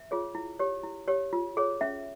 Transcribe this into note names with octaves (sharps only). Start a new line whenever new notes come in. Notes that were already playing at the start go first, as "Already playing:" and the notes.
Already playing: E5
F4 G#4 C#5
E4
G4 C#5
E4
G4 C#5
F4
G#4 C#5
C#4 E5